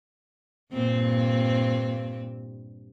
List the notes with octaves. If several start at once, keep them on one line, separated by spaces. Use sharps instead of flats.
G2 A#2 C4